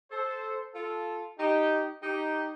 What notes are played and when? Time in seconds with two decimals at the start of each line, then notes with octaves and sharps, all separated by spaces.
0.11 A4 C5
0.74 F4 A4
1.38 D#4 G4
2.01 D#4 G4